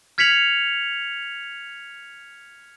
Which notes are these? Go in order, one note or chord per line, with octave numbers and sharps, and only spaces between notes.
F6 G#6 B6 C#7 F7 F#7